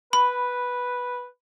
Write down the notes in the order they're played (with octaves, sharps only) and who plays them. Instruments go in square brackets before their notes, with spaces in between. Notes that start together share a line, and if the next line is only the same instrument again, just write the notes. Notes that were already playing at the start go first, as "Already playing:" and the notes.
[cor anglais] B4 [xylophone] B5